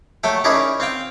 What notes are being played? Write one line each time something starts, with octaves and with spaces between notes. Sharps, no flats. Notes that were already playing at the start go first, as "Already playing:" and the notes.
F#3 A3 A4 G5
C#4 D#4 E4 G#4 A#4 D5
C4 F5 G5